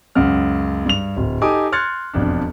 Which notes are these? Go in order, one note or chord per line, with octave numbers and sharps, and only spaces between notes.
C#2 F#2 F#5 F6
G2 F7
D1
D#4 G4 A4 G#5 D6 D#6
C6 F6 F#6 G#6 A6 C#7
E1 F2 D4